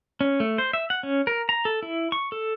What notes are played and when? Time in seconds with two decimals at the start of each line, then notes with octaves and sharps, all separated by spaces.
0.21 C#4
0.40 A3
0.58 C5
0.73 E5
0.90 F#5
1.03 C#4
1.27 A#4
1.49 A#5
1.65 A4
1.83 E4
2.12 C#6
2.32 A4